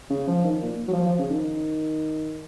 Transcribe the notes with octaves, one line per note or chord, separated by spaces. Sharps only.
C#3
F3
D#3
A#2
F#3
F3
F3
C#3
D#3